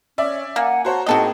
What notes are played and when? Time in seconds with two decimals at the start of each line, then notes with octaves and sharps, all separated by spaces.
0.18 C#4 D5 E5
0.56 A#3 F#5 G#5
0.85 F#4 C5 C#5 A5 A#5
1.06 A2 A#3 C4 D#4 F#4 G#4 A4 D#5